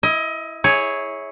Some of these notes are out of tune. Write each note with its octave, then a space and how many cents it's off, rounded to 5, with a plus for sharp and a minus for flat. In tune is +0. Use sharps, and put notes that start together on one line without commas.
E4 +0 D#5 +25
E4 -20 G#4 +0 C#5 +0